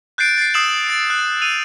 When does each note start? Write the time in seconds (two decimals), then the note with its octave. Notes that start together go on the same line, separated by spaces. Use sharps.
0.18 F#6 G6 A6 C7 D7
0.38 A6 C7
0.54 D#6 E6 C7 E7 F#7
0.87 A6 D7
1.10 F#6
1.42 E6 D#7 F7